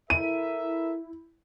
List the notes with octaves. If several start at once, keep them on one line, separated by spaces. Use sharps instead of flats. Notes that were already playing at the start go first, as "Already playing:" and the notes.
E4 A4 A#4 E5 D#7